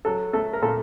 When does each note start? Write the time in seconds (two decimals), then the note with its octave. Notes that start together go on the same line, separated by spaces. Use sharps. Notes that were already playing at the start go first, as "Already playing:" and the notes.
0.05 F#3 A4
0.33 A3 A4
0.53 A#4
0.62 A#2 A4